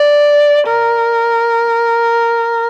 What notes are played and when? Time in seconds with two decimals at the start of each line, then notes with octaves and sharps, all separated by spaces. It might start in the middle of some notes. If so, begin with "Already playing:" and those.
Already playing: D5
0.67 A#4